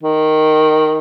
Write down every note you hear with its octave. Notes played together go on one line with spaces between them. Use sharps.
D#3